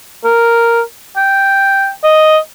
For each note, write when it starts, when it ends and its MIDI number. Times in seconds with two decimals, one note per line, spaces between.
0.25 0.81 70
1.17 1.90 79
2.03 2.38 75